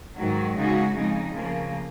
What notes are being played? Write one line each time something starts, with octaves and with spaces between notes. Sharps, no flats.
G#2 D#3 F#3
C#3 G#3 D#4 F#4
F2 C#3 G#3 D#4
C#3 F3 A#3